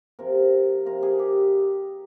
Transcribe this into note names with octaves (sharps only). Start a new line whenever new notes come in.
C3 F3 A#4
C3 F3 A#4
G#4
G4